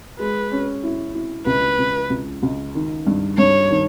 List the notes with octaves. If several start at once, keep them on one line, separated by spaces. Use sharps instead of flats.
G#3 B4
C#4
E4
E4
C#2 B4
C#2
C#2
C#2
D#3
G2
G2 C#5
D#3